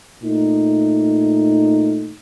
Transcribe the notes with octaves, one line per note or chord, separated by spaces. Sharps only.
A#2 A3 D#4